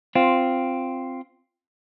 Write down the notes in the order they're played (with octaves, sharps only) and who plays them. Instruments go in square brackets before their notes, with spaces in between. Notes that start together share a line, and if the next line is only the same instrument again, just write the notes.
[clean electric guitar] C4 F4